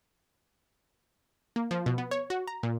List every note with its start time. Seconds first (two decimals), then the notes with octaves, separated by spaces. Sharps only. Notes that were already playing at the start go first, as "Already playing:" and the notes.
1.56 A#3
1.71 F3
1.86 B2
1.98 B3
2.11 C#5
2.30 F#4
2.47 A#5
2.63 A#2